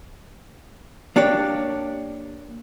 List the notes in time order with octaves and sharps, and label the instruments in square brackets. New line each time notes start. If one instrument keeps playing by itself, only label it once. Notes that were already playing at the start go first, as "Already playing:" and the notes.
[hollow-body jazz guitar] A#3 D4 G4 C#5